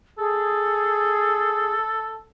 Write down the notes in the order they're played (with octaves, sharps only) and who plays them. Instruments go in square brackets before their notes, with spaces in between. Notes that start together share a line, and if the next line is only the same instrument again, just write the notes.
[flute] G#4 [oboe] A4